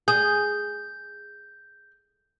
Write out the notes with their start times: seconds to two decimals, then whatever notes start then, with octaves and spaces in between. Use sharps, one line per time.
0.08 G#4 G6